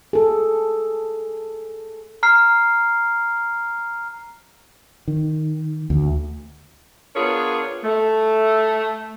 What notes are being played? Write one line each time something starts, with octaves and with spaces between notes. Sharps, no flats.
G#4 A4
A#5 F6 C7
D#3
D2
B3 D4 F4 G#4 A#4 C#5
A3